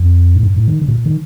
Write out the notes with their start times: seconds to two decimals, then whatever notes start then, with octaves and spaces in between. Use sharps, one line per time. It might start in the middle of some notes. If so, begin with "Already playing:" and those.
Already playing: F2
0.35 A2
0.43 G2
0.56 A2
0.68 D#3
0.82 D3
0.88 A2
0.94 A#2
1.06 D#3